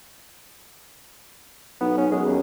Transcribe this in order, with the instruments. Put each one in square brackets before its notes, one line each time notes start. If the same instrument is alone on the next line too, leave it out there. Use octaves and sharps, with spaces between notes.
[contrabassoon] B1 [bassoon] B3
[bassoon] C#4
[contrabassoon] F#2 [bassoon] G#3
[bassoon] D#2